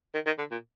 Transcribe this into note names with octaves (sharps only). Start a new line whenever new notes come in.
D#3
D#3
D3
A#2